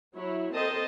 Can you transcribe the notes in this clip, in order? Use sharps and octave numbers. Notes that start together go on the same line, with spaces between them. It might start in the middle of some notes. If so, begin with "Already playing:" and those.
F#3 E4 C#5
C4 A4 A#4 C5 D#5 A5